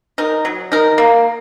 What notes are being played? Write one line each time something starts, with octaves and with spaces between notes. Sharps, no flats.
D#4 A#4
F#3
D#4 A#4
A#3